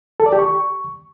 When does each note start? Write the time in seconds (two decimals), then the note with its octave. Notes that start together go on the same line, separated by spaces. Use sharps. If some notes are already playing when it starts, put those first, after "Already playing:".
0.20 A4
0.26 D5
0.32 G4
0.39 C#6